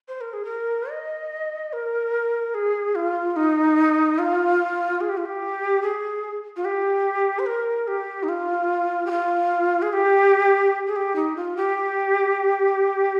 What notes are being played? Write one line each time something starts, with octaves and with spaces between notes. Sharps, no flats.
C5
A#4
G#4
A#4
D#5
A#4
G#4
F4
D#4
F4
G#4
G4
F4
G4
G#4
F4
G4
C5
A#4
G4
D#4
F4
G4
F4
G#4
G4
G#4
G4
D#4
F4
G4